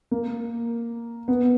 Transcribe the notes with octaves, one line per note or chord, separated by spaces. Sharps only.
A#3
B3